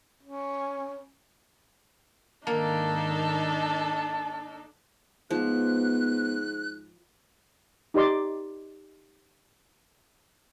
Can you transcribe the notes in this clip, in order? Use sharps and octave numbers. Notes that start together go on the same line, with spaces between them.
C#4
G#2 D#3 A#3 D4 D#4 A4 A5
G#2 F3 B3 F#6
D#4 G4 D5 C6 D6